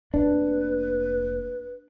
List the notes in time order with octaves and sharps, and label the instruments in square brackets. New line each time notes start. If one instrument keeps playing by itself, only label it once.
[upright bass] F1 A#3 [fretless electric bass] D4 [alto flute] B4